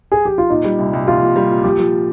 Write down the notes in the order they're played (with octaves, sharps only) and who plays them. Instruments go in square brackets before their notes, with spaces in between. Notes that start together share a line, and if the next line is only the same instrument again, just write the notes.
[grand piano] G#4
G4
F4
[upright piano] A#2 [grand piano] D#4
[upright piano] G3
C2
C2
[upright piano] A#2 [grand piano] F4
[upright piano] A#2
G3
A#2
[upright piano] F3 [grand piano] G4
[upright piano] F3